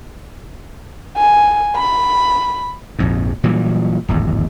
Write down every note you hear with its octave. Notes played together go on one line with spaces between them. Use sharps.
G#5
B5
A#1 F2 G#2
A#2 E3 F#3 G3
D1 G#1 E2